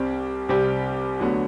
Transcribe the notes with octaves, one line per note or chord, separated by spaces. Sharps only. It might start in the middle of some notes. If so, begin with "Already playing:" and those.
Already playing: C2 C3 G3 C4 G4
C2 C3 G3 C4 G4
D2 D3 F#3 B3